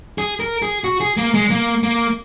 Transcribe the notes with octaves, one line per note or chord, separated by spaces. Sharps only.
G#4
A#4
G#4
F#4
G#4
A#3
G#3
A#3
A#3